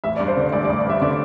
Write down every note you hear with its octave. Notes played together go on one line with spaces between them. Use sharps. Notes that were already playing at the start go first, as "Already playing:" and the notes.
A1 E5
D5
G2
C5
D3 D5
A1 D5
D5
A1
D5
G2 E5
D3 D5